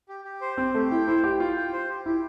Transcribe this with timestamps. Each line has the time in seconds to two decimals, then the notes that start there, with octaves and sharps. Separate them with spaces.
0.09 G4
0.25 G4
0.41 C5
0.57 C4 G4
0.74 A3 G4
0.91 E4 G5
1.07 E4 C5
1.24 G4 G5
1.40 F4 G5
1.57 G5
1.73 C5
1.89 G4
2.05 E4 G4